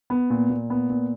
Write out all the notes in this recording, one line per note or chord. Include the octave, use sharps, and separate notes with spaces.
B3
A#2
A#2
B3
A#2